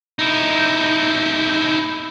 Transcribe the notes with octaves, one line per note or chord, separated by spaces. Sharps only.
D#4 E4